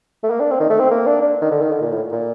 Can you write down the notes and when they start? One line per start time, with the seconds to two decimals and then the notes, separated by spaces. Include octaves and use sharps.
0.23 A3
0.30 A#3
0.40 D4
0.51 C4
0.60 D#3
0.70 A3
0.80 C4
0.91 A#3
1.06 D4
1.21 D4
1.41 D#3
1.51 D3
1.61 D#3
1.72 D3
1.82 A#2
1.92 A2
2.12 A#2